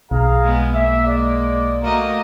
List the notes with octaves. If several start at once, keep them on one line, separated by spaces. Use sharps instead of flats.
B1 G#4 F5 A#5
G#3 B3
A#3 E5
G#3 D5
A3 A#3 F#4 A#4 D#5 A#5